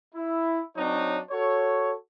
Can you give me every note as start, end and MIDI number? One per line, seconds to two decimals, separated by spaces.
0.15 0.60 64
0.77 1.19 54
0.77 1.19 60
0.77 1.19 62
0.77 1.19 63
0.77 1.19 73
1.31 1.93 66
1.31 1.93 69
1.31 1.93 73